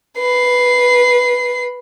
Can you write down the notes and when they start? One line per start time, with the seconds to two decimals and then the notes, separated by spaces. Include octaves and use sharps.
0.18 B4 C7